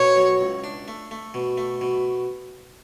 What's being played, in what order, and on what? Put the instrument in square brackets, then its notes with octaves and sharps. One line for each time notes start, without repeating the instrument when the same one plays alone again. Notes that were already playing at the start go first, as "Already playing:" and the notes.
Already playing: [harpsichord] B2 [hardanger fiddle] C#5
[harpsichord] F#3
C#2
D4
A3
A3
B2
A3
B2